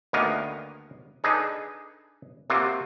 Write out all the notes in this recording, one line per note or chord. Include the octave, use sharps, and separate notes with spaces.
D2 D#3 A#3 B3 D#5 F5
D4 D#4 G#4 A4 B4 D#5
C3 A#3 C4 F4 F#4